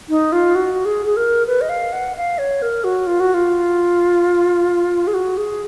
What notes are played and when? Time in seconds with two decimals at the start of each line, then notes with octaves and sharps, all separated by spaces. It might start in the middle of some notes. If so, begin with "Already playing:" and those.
0.09 D#4
0.32 F4
0.55 F#4
0.85 G#4
1.06 G#4
1.17 A#4
1.47 B4
1.61 D#5
1.69 F5
1.93 F#5
2.16 F5
2.38 C#5
2.62 A#4
2.84 F#4
3.07 F4
3.20 F#4
3.34 F4
5.07 G#4
5.14 F#4
5.37 G#4